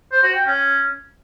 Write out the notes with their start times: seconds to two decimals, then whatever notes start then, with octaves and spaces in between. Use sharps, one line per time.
0.12 C5
0.23 F#4
0.35 G5
0.46 C#4